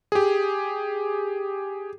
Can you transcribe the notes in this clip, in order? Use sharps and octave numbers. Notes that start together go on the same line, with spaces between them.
G4 G#4